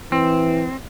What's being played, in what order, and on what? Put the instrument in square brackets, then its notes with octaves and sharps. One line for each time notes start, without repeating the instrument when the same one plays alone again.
[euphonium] E3 [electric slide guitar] C4